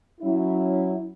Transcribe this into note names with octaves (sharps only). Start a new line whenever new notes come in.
F#3 C#4 E4